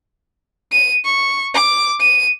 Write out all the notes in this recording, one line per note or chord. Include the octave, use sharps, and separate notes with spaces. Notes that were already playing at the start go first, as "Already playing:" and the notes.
D#7
C#6
D6
D#7